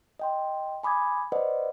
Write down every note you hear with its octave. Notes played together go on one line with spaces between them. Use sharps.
D#5 G5 C6
G#5 B5 D6 D#6 G#6
B4 C5 D5 D#5 F#5